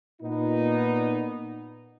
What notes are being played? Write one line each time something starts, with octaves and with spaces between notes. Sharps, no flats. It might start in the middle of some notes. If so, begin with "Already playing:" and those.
A#2 B3 D#4